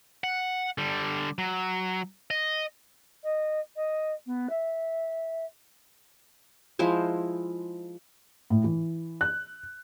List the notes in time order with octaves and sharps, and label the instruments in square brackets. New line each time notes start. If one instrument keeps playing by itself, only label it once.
[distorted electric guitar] F#5
D3 G3
F#3
D#5
[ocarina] D#5
D#5
B3
E5
[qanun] F3 G#3 E4 C5
[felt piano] A2
E3
F#6